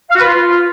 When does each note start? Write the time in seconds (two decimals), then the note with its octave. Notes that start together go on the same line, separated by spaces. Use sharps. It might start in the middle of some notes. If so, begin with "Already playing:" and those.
0.10 F5
0.15 F#4
0.20 B4
0.25 F4